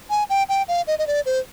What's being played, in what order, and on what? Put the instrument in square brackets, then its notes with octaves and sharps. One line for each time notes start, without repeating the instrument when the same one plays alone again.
[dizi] G#5
G5
G5
F5
D#5
D#5
D5
C5